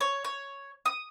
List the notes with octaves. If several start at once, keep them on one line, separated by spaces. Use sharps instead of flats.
C#5
C#5
D#6